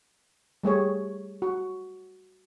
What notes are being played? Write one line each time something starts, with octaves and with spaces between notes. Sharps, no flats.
G3 A3 G#4 C#5
F#4